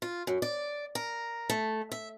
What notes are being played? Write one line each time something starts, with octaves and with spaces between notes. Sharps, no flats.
F4
F#2
D5
A#4
A3
E5